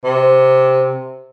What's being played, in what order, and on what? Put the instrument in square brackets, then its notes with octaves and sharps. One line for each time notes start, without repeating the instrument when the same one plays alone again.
[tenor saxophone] C3